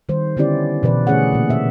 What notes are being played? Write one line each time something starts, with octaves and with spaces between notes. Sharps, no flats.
D#3 G3 C5
D3 B3 C#4 E4 G4 D5
B2 E3 B4 D5
D3 A3 C#4 G#4 C#5 F#5
A#2 A#3
B3 E5